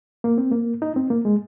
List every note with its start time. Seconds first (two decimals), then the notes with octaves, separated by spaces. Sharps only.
0.24 A#3
0.38 C4
0.51 A#3
0.82 D#4
0.96 C4
1.10 A#3
1.25 G#3